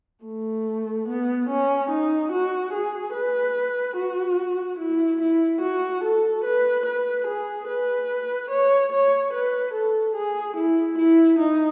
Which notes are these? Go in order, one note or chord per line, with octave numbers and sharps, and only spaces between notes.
A3
B3
C#4
D#4
F#4
G#4
B4
F#4
E4
E4
F#4
A4
B4
B4
G#4
B4
C#5
C#5
B4
A4
G#4
E4
E4
D#4